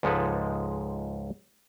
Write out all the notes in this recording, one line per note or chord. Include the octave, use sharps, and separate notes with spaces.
C#2 G#2 F3 G#3 A4 B4